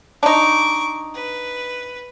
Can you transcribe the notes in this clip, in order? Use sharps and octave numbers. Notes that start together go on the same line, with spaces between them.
D4 D#4 C#6 D6
B4